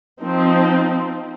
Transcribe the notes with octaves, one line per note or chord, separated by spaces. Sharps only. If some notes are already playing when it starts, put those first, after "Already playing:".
F3 C4 D#4